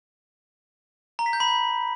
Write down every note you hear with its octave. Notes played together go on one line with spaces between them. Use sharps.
A#5
B6
G6
B5
G6